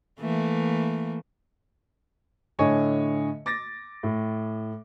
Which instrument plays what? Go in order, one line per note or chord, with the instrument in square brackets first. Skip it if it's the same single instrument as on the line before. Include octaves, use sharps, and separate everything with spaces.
[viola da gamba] E3 A3 A#3
[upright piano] A2 D3 C#5 D#5 G#5 C#6
D6 A6 A#6
A2